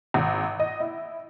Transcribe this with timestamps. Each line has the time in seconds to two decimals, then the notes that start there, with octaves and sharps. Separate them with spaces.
0.14 G#1
0.60 D#5
0.80 E4